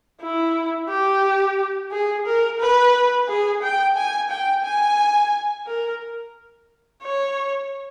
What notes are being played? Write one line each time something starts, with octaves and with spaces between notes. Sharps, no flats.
E4
G4
G#4
A#4
B4
G#4
G5
G#5
G5
G#5
A#4
C#5